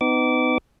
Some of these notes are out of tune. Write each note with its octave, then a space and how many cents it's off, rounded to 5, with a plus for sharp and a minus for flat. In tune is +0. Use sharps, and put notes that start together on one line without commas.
B3 +35 D#4 +0 D6 -20